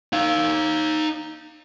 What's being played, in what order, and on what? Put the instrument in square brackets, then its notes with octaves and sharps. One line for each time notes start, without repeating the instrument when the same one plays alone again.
[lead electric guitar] D#4 F5